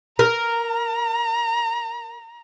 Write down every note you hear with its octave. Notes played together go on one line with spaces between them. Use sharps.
A#4 A#5